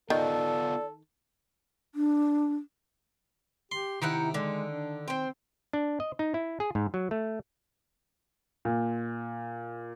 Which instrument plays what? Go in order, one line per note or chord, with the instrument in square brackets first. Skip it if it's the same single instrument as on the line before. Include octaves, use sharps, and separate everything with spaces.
[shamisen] D#3 [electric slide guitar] B3 F4 [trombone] A4 [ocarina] D5
[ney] D4
[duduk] G4 [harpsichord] C6
[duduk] C3 [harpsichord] D#3 [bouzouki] D#4 E4 F#5
[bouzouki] D3 [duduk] G#3
[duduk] D4
[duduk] C4 [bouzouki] C5 G5
[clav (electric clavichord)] D4
D#5
D#4
E4
G#4
G#2
F#3
A3
[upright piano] A#2